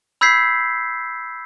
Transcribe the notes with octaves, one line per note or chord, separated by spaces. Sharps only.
B5 E6 G6 G#6 B6 C7